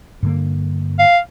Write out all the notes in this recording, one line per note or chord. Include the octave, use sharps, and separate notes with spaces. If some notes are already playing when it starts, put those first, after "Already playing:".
G2 D3 A#3
F5